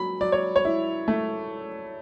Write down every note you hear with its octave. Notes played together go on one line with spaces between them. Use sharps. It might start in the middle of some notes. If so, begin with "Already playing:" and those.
Already playing: F#3 B5
F#3 D5
C#5
C#5
E4
A3